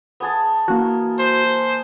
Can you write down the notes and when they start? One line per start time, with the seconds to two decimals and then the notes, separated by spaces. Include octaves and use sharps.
0.20 B3 G#4 A5
0.68 E3 A#3 F#4
1.19 C5